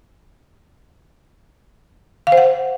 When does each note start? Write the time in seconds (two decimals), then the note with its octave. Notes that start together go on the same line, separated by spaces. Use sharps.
2.27 F5
2.32 C5
2.37 F#5